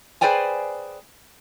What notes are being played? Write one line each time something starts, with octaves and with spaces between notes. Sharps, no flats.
G#4 B4 C5 D5 G5 G#5